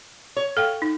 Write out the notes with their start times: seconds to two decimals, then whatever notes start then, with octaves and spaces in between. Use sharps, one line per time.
0.37 C#5
0.57 A4 F5 G5
0.82 D#4